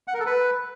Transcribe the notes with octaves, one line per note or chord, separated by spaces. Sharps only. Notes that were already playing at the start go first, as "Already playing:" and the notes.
F#5
A#4
A4
B4